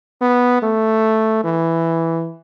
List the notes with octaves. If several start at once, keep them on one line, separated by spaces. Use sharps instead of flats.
B3
A3
E3